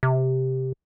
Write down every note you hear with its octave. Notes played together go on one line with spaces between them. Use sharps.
C3